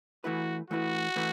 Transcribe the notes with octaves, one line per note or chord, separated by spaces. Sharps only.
E3 A3 E4 F#4 B4
E3 A3 E4 F#4 B4
E3 A3 E4 B4